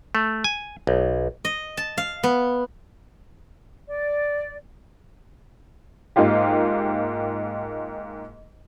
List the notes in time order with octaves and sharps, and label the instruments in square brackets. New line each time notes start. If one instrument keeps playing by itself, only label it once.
[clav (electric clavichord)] A3
G#5
B1
[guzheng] D#5
A5
F5
B3
[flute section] D5
[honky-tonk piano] G#2 A#3 D#4 F4 G4